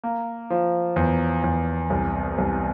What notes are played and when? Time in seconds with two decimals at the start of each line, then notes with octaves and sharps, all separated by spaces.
0.04 A#3
0.50 F3
0.96 E2
1.44 E2
1.90 C2
2.38 C2